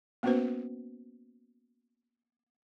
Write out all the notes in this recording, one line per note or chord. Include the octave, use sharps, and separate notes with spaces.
A#3 B3 C#4 F#4 B4 C5